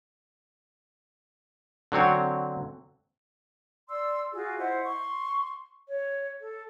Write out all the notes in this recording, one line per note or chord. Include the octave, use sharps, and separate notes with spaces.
D3 F#3 C4 C#5
D5 C6 E6
F4 F#4 G#4
E4 C5 D#5 F#5
C6 C#6
C#5
A4